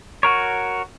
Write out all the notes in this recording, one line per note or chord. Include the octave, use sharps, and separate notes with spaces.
F#4 A#4 C#5